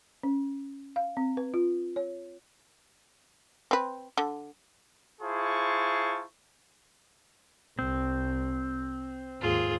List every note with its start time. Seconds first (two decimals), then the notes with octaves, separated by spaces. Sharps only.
0.23 C#4
0.96 F5
1.17 C4
1.37 B4
1.54 F4
1.96 C#5
3.71 C4 B4
4.18 D3
5.22 E4 F4 G#4 C5 A5 C#6
7.79 C2 C4
9.41 D#2 G#2 F4 G#4